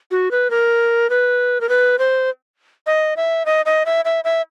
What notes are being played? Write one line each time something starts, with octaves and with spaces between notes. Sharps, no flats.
F#4
B4
A#4
B4
A#4
B4
C5
D#5
E5
D#5
D#5
E5
E5
E5